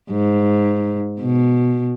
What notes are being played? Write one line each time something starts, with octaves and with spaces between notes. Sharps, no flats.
G#2
B2